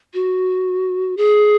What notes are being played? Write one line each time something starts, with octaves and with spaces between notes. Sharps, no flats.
F#4
G#4